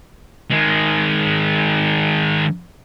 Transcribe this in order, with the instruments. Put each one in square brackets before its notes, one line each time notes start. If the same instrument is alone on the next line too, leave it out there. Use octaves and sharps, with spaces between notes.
[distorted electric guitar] D#3 G#3